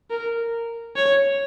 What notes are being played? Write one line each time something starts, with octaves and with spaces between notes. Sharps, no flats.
A#4
C#5